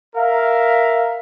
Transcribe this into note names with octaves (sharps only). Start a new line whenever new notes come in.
A#4 E5 F5